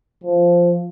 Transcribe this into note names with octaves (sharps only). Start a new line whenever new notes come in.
F3